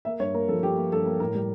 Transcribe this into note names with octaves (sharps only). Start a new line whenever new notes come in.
A#3 E5
G2 C#5
A#3 A#4
F3 A4
F3 G4
A#3
G2 A4
A#3
A2 A#4
G3